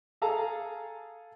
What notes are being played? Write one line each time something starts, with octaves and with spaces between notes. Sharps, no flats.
G#4 A4 F5 A5 A#5